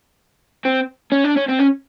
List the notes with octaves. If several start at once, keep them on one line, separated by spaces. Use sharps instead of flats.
C4
C#4
D4
C#4
C4
C#4